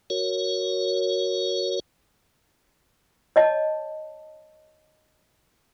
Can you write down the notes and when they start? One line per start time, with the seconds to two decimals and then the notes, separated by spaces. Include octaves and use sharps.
0.10 F#4 A#4 C#5
3.36 C#5 D#5 A5